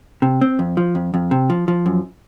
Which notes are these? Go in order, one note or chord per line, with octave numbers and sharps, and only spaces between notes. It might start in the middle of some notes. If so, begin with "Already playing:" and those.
C3
C4
F2
F3
F2
F2
C3
F3
F3
F#2